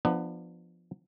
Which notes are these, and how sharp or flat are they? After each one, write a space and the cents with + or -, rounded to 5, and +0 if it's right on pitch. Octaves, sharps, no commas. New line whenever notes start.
F3 +0 B3 +0 D4 +30